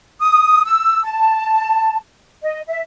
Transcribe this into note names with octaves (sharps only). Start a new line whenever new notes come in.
D#6
E6
A5
D#5
E5